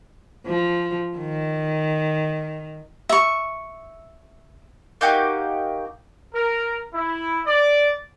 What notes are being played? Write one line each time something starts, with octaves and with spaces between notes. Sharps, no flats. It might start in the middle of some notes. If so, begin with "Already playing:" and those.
F3
D#3
E5 C#6
A#3 D#4 F#4 G4
A#4
E4
D5